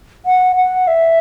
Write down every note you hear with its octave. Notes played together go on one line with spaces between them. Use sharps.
F#5
F#5
E5